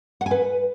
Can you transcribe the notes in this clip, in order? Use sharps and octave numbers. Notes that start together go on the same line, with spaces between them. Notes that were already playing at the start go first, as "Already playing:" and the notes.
F#5
G#5
B4